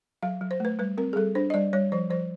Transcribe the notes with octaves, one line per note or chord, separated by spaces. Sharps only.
F#3 F5
F#3
C5
A3 B4
G3 B4
C4 A#4
G#4
G3 A4
D4 C5
D#5
G3 D5
G3 C#5
F3 C5
F3 C5